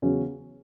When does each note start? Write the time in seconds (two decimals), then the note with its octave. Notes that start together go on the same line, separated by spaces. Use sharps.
0.02 E2 C#3 F#3 C#4